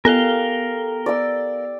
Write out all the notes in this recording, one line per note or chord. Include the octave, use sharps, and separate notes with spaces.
B3 G4 A4 A#4 F5 G7
D5 E6